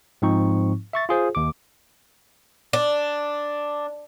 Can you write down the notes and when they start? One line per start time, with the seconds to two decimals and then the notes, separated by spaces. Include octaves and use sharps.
0.22 G#2 F3 C4 D#4 C#6
0.93 E5 C#6 A6
1.09 F4 G#4 C5
1.35 D#2 D6
2.73 D4